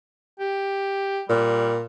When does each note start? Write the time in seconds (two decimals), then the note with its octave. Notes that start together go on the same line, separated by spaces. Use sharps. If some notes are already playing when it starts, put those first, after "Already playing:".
0.40 G4
1.29 A#2 G3